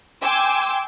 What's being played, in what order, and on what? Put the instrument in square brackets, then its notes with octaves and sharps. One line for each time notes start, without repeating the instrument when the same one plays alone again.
[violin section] G5 G#5 C6 D6 E6